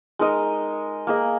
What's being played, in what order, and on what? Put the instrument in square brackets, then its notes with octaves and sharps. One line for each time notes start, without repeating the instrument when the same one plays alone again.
[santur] G#3 D#4 A#4 D#5
A#3 G#4 D#5